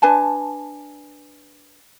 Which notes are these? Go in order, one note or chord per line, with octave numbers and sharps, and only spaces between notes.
D4 B4 G#5 A5